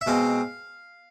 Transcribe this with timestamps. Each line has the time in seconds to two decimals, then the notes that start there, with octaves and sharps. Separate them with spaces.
0.01 E5
0.06 B2 G#3 C4 F5